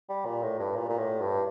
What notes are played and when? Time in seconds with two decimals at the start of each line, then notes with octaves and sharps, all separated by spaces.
0.09 G3
0.25 A#2
0.43 A2
0.60 G2
0.76 A#2
0.89 A#2
0.98 A2
1.21 G2